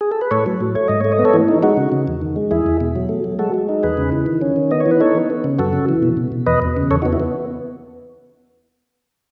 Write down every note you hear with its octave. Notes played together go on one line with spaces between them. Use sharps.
G#4
A4
B4
A2 A4 C#5
F#3
A2
A3 C#5
G#2 D#5
A3 C#5
D#5
B3
A4 C#5
E3
D#4
G#3 D#4 F#4
C#3
C#3
E2
D#3
G#3
E2 E4 G#4
E2
B2
F#3
A3
F#3
G#3 F#4 A4
G#3
D#4
E2 G#4 B4
C#3
E3
D#3
C#4
D#3
B3 D#5
C#5
E3
B4
D#4 A4 C#5
B3
B3
C#3
F#2 F#4 A4
C#3
E3
B2
B2
B2
E2 B4 D#5
E2
C#3
E2 A4 C#5
D#4 F#4
B3
E4
B3